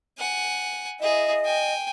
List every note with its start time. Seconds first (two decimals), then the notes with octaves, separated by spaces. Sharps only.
0.18 F#5 G#5
1.01 E4 G#4 D#5
1.45 G5 G#5